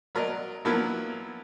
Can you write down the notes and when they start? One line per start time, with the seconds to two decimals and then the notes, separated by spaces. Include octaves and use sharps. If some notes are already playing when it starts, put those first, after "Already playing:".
0.15 F#3 A#4 D5 D#5
0.65 F3 F#3 A#3 B3 E4 A#4